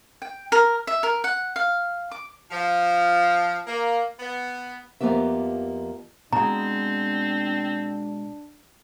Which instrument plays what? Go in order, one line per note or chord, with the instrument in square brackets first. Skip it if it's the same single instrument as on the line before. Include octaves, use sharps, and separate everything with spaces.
[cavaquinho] G5
A#4
E5
A#4
F#5
F5
D6
[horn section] F3
A#3
B3
[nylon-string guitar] F2 F3 A#3 B3 G4 E5
[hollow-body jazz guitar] B2 G#3 [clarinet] C4 [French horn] D4 [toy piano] A#5